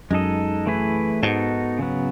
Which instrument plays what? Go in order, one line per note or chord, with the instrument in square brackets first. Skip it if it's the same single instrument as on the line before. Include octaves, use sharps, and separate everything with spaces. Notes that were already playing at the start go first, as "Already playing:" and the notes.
[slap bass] F#2 [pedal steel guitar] G#3 D#4 A4 D#5
[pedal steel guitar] E3 A3 E4 G#4 B4
[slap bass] G#2 [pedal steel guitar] B3 D#4 F#4 A4
[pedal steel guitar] C#3 F#3 B3